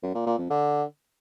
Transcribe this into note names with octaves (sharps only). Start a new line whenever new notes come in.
F#2
A#2
A#2
F2
D3